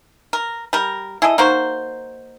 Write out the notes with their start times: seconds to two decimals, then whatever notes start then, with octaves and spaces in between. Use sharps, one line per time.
0.33 A#4
0.73 G3 A#4
1.22 E4 G#4 A4 D#5
1.38 A#3 D#4 F#4 C5